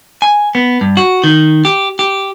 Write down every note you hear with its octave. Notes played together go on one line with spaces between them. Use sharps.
G#5
B3
G2
F#4
D#3
G4
G4